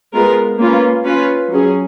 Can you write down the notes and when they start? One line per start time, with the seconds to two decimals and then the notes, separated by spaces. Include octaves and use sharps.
0.14 G#3 B3 F4 A#4
0.59 A#3 C#4 F4 B4
1.04 C#4 F4 B4
1.50 F#3 C#4 G#4